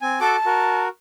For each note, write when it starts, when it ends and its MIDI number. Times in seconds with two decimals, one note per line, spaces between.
0.01 0.19 60
0.01 0.19 80
0.20 0.36 66
0.20 0.36 69
0.20 0.82 81
0.20 0.36 86
0.46 0.89 66
0.46 0.89 70